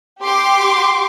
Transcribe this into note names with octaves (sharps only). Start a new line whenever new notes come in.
G4 C6 D6